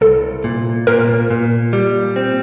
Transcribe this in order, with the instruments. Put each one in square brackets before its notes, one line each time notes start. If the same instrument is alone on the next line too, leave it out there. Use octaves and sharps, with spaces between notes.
[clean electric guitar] C2 [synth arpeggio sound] A4
[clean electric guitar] A#2
[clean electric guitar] A#2 [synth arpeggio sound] A#4
[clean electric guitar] A#2
G3
C4